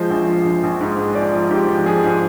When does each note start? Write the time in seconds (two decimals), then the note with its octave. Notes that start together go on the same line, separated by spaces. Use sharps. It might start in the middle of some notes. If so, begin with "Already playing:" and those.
Already playing: F3 G#3 C5
0.10 A#1
0.27 F3
0.45 A#1
0.63 A#1
0.80 G#2
0.98 G#3
1.15 F3 D5
1.34 F3
1.51 G#2 G4
1.69 F3
1.86 F3 G#4
2.03 G#2